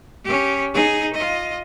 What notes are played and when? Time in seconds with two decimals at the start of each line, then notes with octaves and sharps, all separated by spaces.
0.24 C#4 G4
0.74 D#4 G#4
1.14 F4 D#5